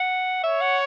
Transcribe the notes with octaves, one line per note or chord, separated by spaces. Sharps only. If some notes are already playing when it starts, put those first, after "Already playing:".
Already playing: F#5
C#5 E5
F#5